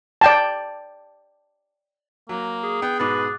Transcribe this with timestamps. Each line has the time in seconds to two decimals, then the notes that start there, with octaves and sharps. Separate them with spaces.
0.21 D5 G5 A5
2.29 F#3 A#3
2.63 G#4
2.82 B3 G5
3.00 G#2 B2 B4 D6 F#6 A6